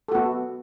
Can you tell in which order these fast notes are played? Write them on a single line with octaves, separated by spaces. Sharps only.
A4 F#4 B3